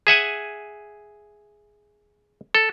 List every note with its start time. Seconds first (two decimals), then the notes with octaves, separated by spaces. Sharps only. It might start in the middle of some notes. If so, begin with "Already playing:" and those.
0.07 G#4 E5 F#5 G#5
2.55 A4